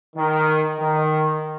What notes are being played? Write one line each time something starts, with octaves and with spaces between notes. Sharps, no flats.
D#3
D#3